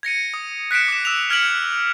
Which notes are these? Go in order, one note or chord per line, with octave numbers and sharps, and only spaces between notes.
G#6 A#6 C#7 D#7
D#6
F#6 B6 C#7 D7 E7
D6 E7
E6 E7 F7
F6 G#6 B6 C#7 D7 F#7